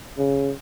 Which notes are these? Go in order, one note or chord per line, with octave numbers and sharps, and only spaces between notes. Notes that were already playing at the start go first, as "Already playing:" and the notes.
C#3